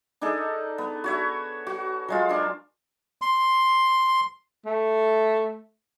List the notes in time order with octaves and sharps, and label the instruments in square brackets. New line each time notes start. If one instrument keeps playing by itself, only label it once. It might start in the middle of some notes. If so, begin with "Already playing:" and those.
[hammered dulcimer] D4 D#4 G#4 A4
B3
F#4 C#5 E5
F#4
F#3 G#3 F4
D4 A#4
[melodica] C6
[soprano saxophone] A3